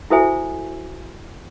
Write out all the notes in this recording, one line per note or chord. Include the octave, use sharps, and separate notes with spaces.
E4 F#4 A4 C5 E5 G#5